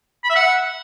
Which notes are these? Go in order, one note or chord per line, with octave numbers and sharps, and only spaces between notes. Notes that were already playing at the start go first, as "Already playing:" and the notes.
B5
E5
F#5